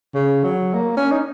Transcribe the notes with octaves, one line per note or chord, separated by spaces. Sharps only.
C#3
F#3
A#3
C#4
D#4